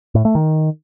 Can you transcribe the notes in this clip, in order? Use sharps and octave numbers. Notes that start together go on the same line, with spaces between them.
A2
A3
D#3